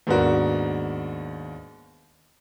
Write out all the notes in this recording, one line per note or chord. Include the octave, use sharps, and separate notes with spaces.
D#2 G#2 B3 D4 F#4 A#4